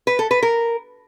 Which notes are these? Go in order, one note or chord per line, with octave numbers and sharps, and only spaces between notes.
B4
A4
B4
A#4